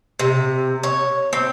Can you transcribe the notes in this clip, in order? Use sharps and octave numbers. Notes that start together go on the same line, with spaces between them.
C3
C#5
C4